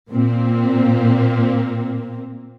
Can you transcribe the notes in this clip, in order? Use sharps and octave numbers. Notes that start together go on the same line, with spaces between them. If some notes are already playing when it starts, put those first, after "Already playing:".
A#2 A#3 C4